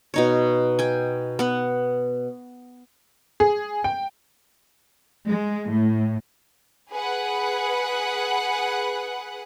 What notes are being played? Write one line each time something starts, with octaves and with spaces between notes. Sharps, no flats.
B2 D#4 C#5
G5 G#5
B3 F#5
G#4
G5
G#3
A2
G#4 B4 F#5